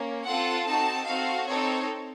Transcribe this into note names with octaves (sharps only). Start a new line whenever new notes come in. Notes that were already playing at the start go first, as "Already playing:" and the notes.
Already playing: A#3 C#4
C4 F4 A4 F#5
C4 D#4 F#4 A4 A5
C4 F#4 A4 F5
C4 D#4 A4 C#5